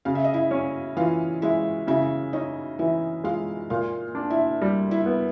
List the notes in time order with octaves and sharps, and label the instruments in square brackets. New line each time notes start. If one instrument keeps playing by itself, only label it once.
[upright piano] C#3 [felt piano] F5
[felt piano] E5
D#5
E4 E5
[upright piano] C#4
[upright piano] E3 [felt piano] F4 F5
[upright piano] G#3 [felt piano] E4 E5
[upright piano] C#3 [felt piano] E4 E5
[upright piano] C#4 [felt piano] D#4 D#5
[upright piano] E3 [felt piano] E4 E5
[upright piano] G#3 [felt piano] F4 F5
[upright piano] A#2 [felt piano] F4 F5
[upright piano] D4
[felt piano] E4 E5
[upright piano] G3
[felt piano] E4 E5
[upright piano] B3